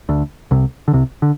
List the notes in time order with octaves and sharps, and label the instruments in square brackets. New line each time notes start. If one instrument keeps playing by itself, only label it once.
[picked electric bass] D2 D3
C2 C3
D3
C2 C3
D3